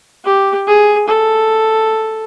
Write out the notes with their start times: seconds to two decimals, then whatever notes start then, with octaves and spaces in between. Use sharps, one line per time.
0.25 G4
0.67 G#4
1.09 A4